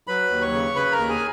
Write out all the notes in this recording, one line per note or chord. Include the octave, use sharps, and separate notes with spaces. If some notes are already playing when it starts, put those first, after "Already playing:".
F#3 B4 B5
D#2
C#5 C#6
C#3
C#3 B4 B5
A#4 A#5
D#2
G#4 G#5